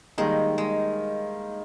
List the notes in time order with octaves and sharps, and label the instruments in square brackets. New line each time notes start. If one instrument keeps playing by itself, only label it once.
[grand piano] D#3 G3 A#3 D#4 [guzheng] G#3
[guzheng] G#3